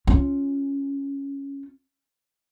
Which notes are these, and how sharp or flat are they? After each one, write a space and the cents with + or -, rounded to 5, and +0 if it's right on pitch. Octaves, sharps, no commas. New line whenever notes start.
C#4 +0 F4 +0